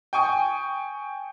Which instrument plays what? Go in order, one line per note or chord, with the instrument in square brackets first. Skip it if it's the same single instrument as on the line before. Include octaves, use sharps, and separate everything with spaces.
[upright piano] G5 G#5 C#6 D#6